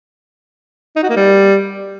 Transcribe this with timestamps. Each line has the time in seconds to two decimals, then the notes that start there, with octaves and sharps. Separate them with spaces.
0.96 D#4
1.03 F#4
1.10 A#3
1.16 G3